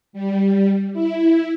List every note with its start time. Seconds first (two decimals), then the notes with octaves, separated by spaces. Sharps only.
0.13 G3
0.93 E4